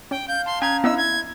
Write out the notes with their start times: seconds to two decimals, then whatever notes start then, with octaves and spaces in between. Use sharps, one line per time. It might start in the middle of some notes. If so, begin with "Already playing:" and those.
0.11 C#4 G5
0.28 F5 G6
0.46 A5 C6
0.62 C#4 G5 A#5 G#6
0.84 B3 D4 E4 D#5 E6
0.98 G#6